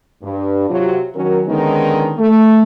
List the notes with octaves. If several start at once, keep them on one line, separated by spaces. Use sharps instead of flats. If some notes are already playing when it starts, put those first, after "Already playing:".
G2
C3 F#3 F4
D#3 F#3 C#4 F#4 A#4
D3 D#3 G#3 B3 C#4 D#4
A3